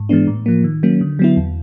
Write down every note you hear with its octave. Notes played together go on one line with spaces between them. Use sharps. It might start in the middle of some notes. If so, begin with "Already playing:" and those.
Already playing: G#2
E3 G#3 B3 D4
A2
F3 A#3
D#3
F#3 A#3 C#4
D3
F#3 B3 E4
E2